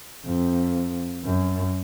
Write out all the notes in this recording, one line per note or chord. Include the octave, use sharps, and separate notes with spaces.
F2
F#2